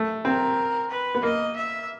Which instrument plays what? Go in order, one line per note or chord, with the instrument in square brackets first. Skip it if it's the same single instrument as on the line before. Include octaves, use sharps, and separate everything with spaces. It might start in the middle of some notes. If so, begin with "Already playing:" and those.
Already playing: [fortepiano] A3
[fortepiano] C4 [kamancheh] A#4
[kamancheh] B4
[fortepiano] B3
[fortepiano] A#3 [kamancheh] D#5
[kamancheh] E5